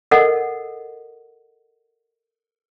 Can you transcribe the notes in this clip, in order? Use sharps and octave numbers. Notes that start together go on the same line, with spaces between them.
A4 A#4 D#5 F#5